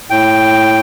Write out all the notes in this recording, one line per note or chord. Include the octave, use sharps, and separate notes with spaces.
A2 G5